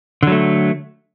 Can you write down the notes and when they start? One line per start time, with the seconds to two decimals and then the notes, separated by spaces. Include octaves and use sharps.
0.23 D3
0.27 F#3
0.32 A3